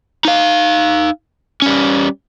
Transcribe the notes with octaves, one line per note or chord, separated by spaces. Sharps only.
D#4 F5
G3 C#4